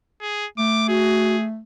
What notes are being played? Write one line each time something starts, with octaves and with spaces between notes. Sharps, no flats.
G#4
A3 D6
F#4 G#4